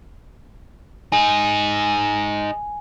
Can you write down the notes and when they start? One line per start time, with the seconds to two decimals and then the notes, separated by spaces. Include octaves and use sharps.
1.12 D#4 G#4 G#5